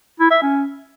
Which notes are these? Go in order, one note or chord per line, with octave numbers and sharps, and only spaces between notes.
E4
E5
C#4